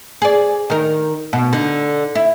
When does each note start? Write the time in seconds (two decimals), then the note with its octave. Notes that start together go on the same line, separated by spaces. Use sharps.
0.22 G#4 D5
0.70 D#3 A#4
1.33 B2
1.53 D3 D#4
2.15 E4